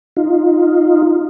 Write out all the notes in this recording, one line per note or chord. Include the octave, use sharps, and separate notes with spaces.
D#4 F4